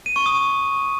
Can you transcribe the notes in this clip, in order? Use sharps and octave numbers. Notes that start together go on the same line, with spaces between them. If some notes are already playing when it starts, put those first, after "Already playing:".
D#7
C#6
D#6